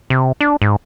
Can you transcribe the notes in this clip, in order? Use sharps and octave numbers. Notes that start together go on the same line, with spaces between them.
C3
D4
G#2